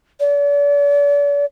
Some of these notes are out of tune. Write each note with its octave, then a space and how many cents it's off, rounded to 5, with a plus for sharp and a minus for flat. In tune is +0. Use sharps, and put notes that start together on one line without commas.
D5 -40